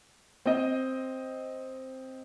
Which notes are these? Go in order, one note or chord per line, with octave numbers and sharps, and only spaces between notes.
C4 D#5